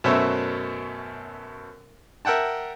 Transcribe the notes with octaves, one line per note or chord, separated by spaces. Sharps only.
F#2 B2 A3 C5 C#5 E5
A#4 E5 F#5 G5 A5